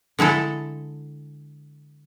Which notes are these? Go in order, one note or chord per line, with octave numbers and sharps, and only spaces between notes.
D3 G#3 E4 A4